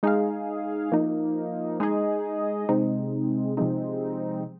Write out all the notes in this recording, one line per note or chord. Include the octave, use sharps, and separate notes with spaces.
G#3 D#4 G#4 F5
F3 A#3 D#4
G#3 D#4 G#4 D#5
C3 G#3 C4 D#4
C3 F3 G#3 C4 D#4